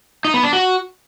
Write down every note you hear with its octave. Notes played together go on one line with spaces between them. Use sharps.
D#4
B3
D4
F#4